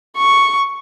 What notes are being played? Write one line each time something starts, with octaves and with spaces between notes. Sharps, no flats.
C#6